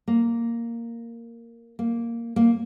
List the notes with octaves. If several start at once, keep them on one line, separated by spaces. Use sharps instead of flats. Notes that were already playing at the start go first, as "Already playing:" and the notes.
A#3
A#3
A#3